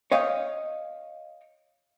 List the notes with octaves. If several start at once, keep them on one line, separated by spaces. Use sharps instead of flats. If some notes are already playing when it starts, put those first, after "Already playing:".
C#5 D#5 F5 G5